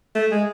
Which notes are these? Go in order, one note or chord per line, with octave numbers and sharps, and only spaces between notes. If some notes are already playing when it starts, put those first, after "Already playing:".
A3
G#3